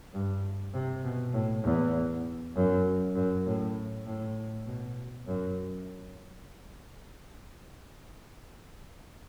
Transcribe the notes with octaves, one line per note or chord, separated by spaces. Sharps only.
G2
C3
B2
A2
E2
F#2
F#2
A2
A2
B2
F#2